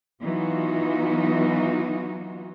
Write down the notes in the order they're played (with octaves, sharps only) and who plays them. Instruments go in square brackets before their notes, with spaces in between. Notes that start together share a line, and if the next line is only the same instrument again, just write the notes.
[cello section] E3 F#3 B3 D#4 F4 F#4